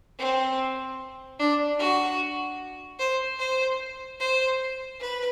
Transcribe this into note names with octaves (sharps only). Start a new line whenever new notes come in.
C4
D4
F#4
C5
C5
C5
B4